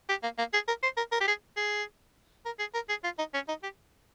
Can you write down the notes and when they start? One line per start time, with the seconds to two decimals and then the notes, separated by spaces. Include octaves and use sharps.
0.09 G4
0.23 A#3
0.38 A#3
0.53 G#4
0.68 A#4
0.83 C5
0.97 A#4
1.12 A#4
1.21 G4
1.28 G#4
1.57 G#4
2.46 A#4
2.59 G#4
2.74 A#4
2.89 G#4
3.04 F4
3.18 D#4
3.34 C#4
3.48 D#4
3.63 G4